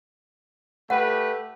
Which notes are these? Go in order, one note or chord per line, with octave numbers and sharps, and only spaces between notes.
A3 G4 B4 F#5 G5